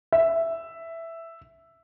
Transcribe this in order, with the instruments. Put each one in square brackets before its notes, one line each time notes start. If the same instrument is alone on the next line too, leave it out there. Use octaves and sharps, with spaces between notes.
[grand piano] E5